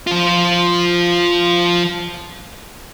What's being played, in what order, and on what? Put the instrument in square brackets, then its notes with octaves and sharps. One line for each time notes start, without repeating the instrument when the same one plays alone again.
[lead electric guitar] F3 F4